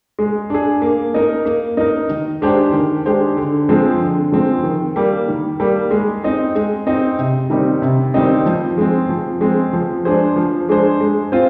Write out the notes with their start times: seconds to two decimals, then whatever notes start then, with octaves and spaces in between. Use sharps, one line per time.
0.19 G#3
0.50 D4 G#4
0.82 A#3
1.14 D#4 A#4
1.45 A#3
1.77 D#4 A#4
2.10 D#3
2.42 G#3 D4 G4 C5
2.73 D#3
3.06 G#3 D4 G4 C5
3.37 D3
3.69 F3 G#3 C4
4.01 D3
4.32 F3 G#3 C4
4.64 D#3
4.96 G3 A#3
5.28 D#3
5.60 G3 A#3
5.91 G#3
6.24 C4 D#4
6.55 G#3
6.87 C4 D#4
7.19 C3
7.50 D#3 G3 C4 D#4
7.82 C3
8.14 D#3 G3 C4 D#4
8.46 F3
8.78 G#3 C4
9.09 F3
9.41 G#3 C4
9.73 F3
10.05 G#3 D4 G#4 C5
10.36 F3
10.69 G#3 D4 G#4 C5
11.01 G#3
11.32 C4 F4 C5